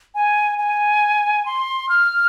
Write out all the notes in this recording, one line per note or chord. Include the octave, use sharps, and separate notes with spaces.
G#5
G#5
C6
F6